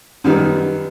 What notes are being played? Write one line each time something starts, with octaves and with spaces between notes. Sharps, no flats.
F#2 D#3 G3 B3